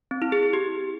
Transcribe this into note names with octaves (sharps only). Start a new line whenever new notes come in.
C4
E4
G#4
G#4
G4